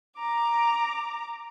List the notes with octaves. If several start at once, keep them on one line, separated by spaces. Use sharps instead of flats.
A#5 D6